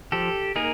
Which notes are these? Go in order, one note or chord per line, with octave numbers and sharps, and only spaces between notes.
F3 G4 A4
A#3 D#4 G#4 A#4